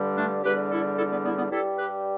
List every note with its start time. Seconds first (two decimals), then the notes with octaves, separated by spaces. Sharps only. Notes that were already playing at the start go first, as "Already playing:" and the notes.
Already playing: G2 D3 G3
0.16 A3 D4
0.43 E2 D3 G3 G4 B4
0.71 E4 A4
0.97 E4 A4
1.11 B3
1.24 B3 E4
1.38 B3 E4
1.51 G2 G3 E4 A4
1.78 G4 B4